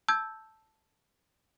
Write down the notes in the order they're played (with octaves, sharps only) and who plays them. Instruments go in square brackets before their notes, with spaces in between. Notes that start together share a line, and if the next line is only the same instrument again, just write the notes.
[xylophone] A5 E6 G6 G#6